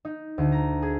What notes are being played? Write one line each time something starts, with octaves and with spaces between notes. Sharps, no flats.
D#4
D2
A#5
G#4